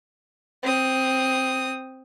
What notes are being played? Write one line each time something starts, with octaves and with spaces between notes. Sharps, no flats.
C4 D#6